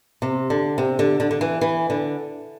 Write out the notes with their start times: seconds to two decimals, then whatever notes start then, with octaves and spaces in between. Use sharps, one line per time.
0.22 C3
0.50 D3
0.78 C3
0.99 D3
1.20 D3
1.31 D3
1.41 E3
1.61 E3
1.90 D3